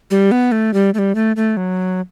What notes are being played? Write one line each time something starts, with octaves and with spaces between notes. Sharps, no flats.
G3
B3
A3
G3
A3
G3
A3
A3
F#3